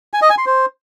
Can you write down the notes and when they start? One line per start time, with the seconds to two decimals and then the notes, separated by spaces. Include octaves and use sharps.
0.14 G#5
0.22 D#5
0.30 G#5
0.38 C6
0.46 C5